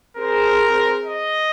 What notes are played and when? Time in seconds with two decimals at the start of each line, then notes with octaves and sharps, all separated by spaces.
0.17 C4 G#4 A#4 C5
1.04 D#5